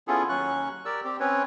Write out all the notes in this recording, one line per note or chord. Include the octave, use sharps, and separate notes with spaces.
B3 C#4 E4 F4 G#4 A4
D#2 F#3 C#4 C#6 F#6
G4 A#4 D5 E6
C4 G4
C4 C#4 B4 C#5